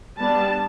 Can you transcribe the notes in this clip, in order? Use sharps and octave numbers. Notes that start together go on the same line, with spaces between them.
G3 B3 D4 A5